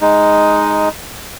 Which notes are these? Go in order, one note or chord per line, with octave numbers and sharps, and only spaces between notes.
G#3 D#4